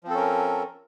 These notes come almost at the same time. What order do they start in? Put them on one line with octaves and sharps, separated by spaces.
F3 C4 A4 C#4 A#4